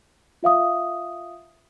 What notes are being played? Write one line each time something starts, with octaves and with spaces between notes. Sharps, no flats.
F4 E5 F5 D#6